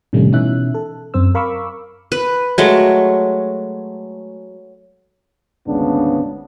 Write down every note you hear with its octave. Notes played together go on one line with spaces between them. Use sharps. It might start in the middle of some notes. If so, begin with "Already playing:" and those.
A2 C3 D#3 G3 A3 C#4
B2 E3 C#4 D#4 E5 F#6
A4
F#2 C4 C5 E6
A#4 F5 B5 C#6 D6 E6
B4
F#3 G#3 A3
G#1 D2 G#2 C#3 B3 D4